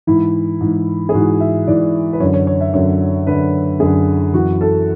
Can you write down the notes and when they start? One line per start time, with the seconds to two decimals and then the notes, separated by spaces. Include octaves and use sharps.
0.07 G#2 E3 E4
0.61 G#2 E3
1.09 G#4
1.14 G#2 E3 F#4
1.40 E5
1.67 G#2 E3 D5
2.13 B4
2.20 F#2 D3 C#5
2.34 C#5
2.47 C#5
2.61 E5
2.74 F#2 D3 C#5
3.27 F#2 D3 B4
3.80 F#2 D3 G#4
4.34 F#2 E3 F#4
4.61 A4